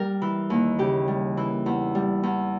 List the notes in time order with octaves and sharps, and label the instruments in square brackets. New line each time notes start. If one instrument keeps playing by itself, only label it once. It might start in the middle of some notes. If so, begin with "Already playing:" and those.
Already playing: [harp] G3 A#4
E3
D#2
C#3 G4
G3
E3
E2
G3
E2